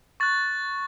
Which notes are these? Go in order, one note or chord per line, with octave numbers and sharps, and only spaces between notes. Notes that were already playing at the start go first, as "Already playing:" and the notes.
C#6 F#6 A6